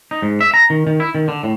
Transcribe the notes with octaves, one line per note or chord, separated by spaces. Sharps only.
D#4
G#2
E5
A#5
D#3
D#3
E4
D#3
D3
A2